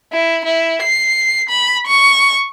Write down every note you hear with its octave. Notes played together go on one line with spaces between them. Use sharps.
E4
E4
C7
B5
C#6